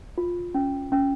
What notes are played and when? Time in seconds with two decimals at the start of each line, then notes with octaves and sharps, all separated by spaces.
0.18 F4
0.54 C#4
0.92 C#4